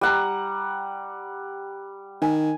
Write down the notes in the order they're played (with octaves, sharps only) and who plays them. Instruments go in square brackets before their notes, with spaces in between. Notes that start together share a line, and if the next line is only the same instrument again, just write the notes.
[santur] G3 F#5 A#5
[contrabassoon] D#3 [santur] G#5